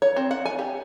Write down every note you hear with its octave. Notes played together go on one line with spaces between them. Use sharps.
C#5
C4
F#5
G#5
G4